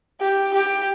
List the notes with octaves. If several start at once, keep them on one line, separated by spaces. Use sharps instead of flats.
G4
G4